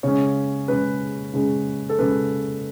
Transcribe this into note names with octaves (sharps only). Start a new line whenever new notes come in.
C#3 G#3 C#4 C#5
C#3 G#3 C#4 B4
C#3 G#3 C#4
A4
C#3 G#3 C#4 B4